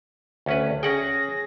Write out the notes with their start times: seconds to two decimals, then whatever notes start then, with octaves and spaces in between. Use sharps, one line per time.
0.46 D2 C#4 B4
0.83 C#4 G#4 F#5 G5 A#6